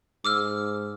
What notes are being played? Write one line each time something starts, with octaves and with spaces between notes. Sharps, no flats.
G#2 D6 E6 F6